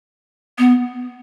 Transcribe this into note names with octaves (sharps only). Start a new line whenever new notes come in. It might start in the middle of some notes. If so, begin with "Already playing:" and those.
B3